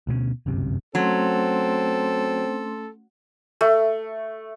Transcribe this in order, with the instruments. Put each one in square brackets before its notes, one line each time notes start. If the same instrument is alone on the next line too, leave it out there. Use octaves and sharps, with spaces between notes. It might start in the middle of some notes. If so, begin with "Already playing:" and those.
[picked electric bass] D2 B2 A3 C#4
G1 C#2 F#2 C3
[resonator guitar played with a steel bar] F#3 [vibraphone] A3 C#4 C6 [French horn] C4 [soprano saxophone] A4
[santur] A3